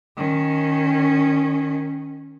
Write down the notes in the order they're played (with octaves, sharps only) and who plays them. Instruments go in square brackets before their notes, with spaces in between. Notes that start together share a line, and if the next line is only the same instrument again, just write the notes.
[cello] D#3 C#4